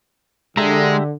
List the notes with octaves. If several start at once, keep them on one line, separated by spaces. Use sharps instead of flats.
D3 G#3 G4 E5 A#5